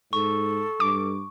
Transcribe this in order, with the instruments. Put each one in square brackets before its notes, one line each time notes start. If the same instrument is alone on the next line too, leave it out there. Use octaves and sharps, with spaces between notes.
[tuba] G#2 [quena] A4 [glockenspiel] C#6
[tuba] G2 [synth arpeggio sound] D6